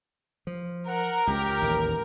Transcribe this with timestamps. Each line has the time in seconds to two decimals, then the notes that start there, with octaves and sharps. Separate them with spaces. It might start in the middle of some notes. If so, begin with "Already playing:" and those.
0.47 F3
0.88 A#4 F#5
1.27 C#2 G4
1.62 A1 D#2